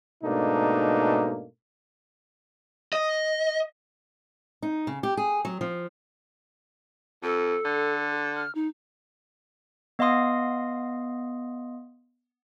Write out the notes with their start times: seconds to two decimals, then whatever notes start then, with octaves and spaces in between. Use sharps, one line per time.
0.23 G#2 B2 A3 A#3 D4 D#4
2.93 D#5
4.62 D#4
4.87 C#3
5.03 G4
5.17 G#4
5.45 F#3
5.61 F3
7.23 F2 A4
7.65 D3
8.35 F6
8.55 D#4
9.99 B3 D#5 F5 C6 D#6